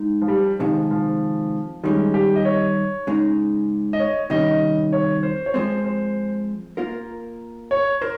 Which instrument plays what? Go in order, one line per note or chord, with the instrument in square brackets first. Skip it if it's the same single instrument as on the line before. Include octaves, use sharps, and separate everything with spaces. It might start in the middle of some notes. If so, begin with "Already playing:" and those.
Already playing: [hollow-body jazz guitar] G#3 D#4
[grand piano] F3
G3
[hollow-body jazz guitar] C3 D#3 G#3 [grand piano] F3
[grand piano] F3
[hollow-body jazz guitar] D#3 G3 C#4 [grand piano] G#3
[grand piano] G4
D#5
C#5
[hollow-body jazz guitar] C#3 G#3 D#4
[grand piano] D#5
C#5
[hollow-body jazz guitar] C3 D#3 G3 C#4 [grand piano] D#5
[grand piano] C#5
C5
C#5
[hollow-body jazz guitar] F3 G#3 C4 [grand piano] C5
[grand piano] C5
[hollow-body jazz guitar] A#3 F4 A#4
[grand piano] C#5
[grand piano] A#4 [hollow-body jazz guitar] C5